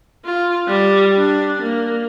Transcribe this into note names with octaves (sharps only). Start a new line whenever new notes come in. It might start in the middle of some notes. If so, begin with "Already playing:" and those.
F4
G3
D4
A#3